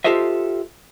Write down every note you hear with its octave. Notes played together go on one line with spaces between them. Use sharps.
F4 G4 A4 C5 D#5 E5